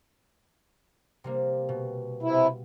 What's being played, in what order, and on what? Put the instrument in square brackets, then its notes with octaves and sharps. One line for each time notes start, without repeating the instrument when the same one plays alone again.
[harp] C3 G3 A#3
B2
[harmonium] C3 E4